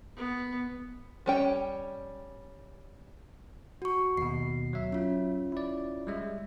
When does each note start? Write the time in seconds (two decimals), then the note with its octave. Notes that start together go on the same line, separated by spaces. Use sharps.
0.16 B3
1.26 G3 C#4 G5
3.82 F#4 C#6
4.17 D#2 B2 C7
4.73 F#3 E5
4.92 C#4 F4
5.52 E4 D5
6.07 G3 G#3 E5